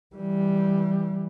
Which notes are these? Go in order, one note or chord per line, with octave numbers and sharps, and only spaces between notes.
E3 G3